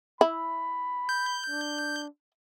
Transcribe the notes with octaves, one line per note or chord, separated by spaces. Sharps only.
E4 B5
G6
D4